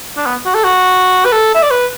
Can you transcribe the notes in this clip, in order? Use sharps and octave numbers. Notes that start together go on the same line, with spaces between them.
D4
B3
F#4
A4
F#4
B4
A4
E5
D5
B4